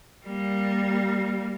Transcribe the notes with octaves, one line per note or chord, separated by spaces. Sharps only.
G3 A#3